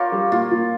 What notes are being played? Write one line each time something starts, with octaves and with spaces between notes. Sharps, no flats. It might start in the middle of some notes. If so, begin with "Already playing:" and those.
Already playing: F4 G4 A#4 C#5
G3
A#2 F4
A#2